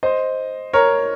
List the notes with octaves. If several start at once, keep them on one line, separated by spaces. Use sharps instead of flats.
C5 D#5
A#4 C#5